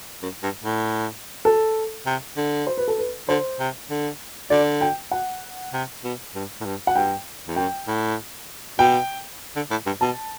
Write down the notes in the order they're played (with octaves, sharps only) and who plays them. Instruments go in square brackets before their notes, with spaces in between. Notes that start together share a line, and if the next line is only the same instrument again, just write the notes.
[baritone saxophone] F#2
G2
A2
[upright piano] A4
[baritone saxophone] C3
D3
[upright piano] C5
B4
A4
B4
[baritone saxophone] D3 [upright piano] C5
[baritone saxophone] C3
D3
[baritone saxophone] D3 [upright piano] D5
[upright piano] G5
F#5
[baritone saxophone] C3
B2
G2
A2
G2
[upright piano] F#5
[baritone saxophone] G2 [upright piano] G5
[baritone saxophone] E2
[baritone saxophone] F#2 [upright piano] G5
[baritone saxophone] A2
[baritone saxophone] B2 [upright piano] G5
[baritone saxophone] D3
A2
G2
[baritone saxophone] B2 [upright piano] A5